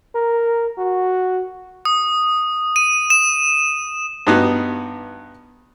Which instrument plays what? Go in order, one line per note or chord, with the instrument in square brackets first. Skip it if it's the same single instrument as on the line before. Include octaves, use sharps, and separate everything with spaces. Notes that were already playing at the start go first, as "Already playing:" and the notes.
[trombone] A#4
F#4
[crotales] D#6
D#7
E7
[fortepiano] G2 B3 D#4 F#4